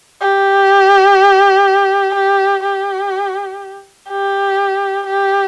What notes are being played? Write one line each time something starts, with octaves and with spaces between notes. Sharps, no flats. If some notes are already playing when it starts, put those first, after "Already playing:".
G4
G4
G4
G4
G4